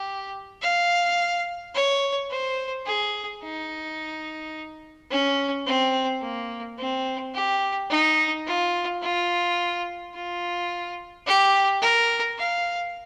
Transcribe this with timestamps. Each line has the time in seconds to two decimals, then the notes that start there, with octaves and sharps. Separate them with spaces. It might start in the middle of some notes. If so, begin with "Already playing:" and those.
Already playing: G4
0.62 F5
1.74 C#5
2.30 C5
2.86 G#4
3.43 D#4
5.10 C#4
5.66 C4
6.21 A#3
6.78 C4
7.34 G4
7.90 D#4
8.46 F4
9.02 F4
10.14 F4
11.26 G4
11.82 A#4
12.38 F5